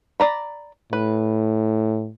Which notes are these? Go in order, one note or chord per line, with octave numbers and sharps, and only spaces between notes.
D5 A#5 B5
A2 B4